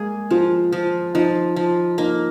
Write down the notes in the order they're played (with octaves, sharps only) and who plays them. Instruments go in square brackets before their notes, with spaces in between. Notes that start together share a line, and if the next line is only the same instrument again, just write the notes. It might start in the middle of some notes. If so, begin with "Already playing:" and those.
Already playing: [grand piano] G#3 [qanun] A#3 G#4
[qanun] F3 [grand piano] F4
[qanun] F3
[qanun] F3 [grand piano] D#4
[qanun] F3
[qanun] A#3 [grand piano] D#4